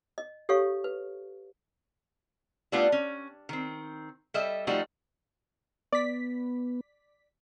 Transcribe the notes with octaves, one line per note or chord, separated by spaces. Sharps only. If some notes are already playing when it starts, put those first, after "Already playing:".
D#5
G4 A4 C#5 F5 C#6
B4
G3 A3 B3 D4 E4 F4
C#4
D#3 C4
G3 A4 D#5 E5
F3 G3 A3 D#4 F#4
B3 D5 B6